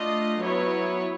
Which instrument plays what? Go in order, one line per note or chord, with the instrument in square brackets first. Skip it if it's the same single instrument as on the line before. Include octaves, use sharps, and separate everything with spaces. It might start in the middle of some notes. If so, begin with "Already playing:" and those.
Already playing: [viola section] A3 D4 F4 D#5
F#3 B3 E4 C#5